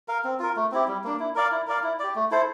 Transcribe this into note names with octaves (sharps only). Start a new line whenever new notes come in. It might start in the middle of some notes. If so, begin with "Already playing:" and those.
A#4 F5
C4
F4 A#4
A3
C4 E4 G4
G3
A#3 D4
E4
A#4 D5 F5
E4
A#4 D5 F5
E4
G4 D5
A3
E4 A4 C5